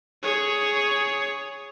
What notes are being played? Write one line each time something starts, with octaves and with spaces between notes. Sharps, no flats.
G#4 C#5